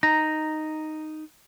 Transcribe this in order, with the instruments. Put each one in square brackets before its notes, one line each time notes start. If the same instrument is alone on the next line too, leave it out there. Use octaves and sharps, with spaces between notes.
[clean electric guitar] D#4 [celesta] A#5 A#6